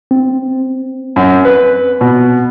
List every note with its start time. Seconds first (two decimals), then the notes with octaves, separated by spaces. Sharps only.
0.11 C4
1.16 F#2
1.45 B4
2.01 B2